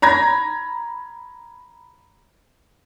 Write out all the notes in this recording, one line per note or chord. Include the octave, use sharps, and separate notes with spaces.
A#5 B5 G#6 A#6